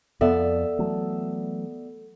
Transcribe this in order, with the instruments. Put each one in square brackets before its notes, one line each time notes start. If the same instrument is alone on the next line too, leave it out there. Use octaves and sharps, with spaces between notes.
[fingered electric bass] F2 [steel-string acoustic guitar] B3 D5 E5 [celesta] A4
[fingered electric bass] E3 F#3 A3